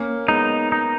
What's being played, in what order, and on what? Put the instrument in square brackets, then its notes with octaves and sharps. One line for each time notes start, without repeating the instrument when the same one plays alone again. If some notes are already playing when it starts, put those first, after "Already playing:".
Already playing: [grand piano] A#3 C#4
[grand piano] G#3 B3 [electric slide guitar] D#4
[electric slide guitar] D#4